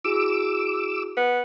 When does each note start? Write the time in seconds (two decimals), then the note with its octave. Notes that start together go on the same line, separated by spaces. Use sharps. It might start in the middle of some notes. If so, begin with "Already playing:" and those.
0.05 E4 F#4 G#4 D6 E6
1.17 B3